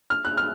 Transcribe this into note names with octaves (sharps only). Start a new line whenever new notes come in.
F6
F#6
F6